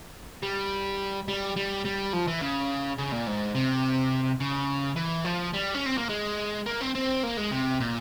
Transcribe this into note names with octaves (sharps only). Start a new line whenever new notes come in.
G3
G3
G3
G3
F3
E3
C#3
C#3
A#2
G#2
C3
C#3
E3
F3
G3
C#4
C4
A#3
G#3
A#3
C4
C4
A#3
G#3
C3
A#2